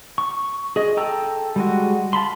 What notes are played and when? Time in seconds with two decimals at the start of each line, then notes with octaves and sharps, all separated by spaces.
0.18 C#6
0.76 G#4 D#5
0.97 A4 G5 A#5 E6
1.56 G3 G#3 F#4
2.13 F5 A5 B5 C6